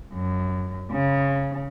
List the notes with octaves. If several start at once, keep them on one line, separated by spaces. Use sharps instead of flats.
F#2
C#3